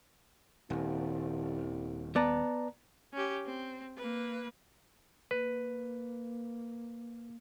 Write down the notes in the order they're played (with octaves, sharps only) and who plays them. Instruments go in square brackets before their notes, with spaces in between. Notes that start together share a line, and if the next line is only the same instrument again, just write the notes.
[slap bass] D#1 [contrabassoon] C2
[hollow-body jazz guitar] B3 [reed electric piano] D5 A5 A#5
[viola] C#4 G4
C4
A#3 B4
[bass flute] A#3 [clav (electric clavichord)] B4